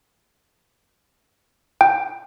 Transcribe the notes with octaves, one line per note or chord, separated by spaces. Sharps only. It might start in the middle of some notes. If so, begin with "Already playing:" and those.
G5